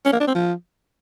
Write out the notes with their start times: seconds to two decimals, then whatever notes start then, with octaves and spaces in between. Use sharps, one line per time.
0.05 C#4
0.13 A#3
0.20 D4
0.28 C4
0.35 F3